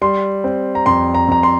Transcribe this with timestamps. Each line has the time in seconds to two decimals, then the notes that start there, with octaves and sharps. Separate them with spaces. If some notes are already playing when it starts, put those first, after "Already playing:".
0.02 G3 C6
0.44 C4
0.75 A#5
0.86 F2 C6
1.14 A#5
1.28 F2 A#5
1.43 C6